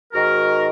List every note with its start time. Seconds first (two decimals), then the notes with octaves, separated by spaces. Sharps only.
0.13 G#2 D#3 F#4 A#4